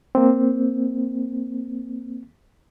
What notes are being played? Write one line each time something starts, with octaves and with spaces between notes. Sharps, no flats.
A#3 C4